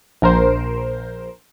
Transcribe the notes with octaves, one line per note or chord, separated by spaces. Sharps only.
A#1 A#4 C5